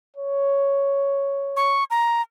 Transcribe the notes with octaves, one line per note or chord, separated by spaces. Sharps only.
C#5
C#6
A#5